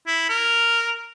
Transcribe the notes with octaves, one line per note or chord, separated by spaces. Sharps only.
E4
A#4